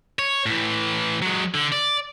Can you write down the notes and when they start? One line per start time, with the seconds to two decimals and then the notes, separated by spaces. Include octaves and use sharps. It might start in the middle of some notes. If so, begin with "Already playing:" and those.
0.19 C#5
0.46 A2 E3
1.22 F#3 G#3
1.55 D3
1.72 D5